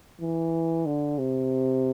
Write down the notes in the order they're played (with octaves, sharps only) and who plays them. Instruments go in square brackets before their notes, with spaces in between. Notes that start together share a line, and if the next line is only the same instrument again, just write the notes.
[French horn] E3
D3
C3